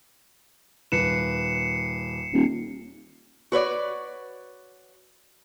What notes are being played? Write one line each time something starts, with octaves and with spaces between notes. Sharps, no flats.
D#1 B4 C7 C#7 E7
D#1
F#4 B4 C#5 D5